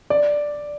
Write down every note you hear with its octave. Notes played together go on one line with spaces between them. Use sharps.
D5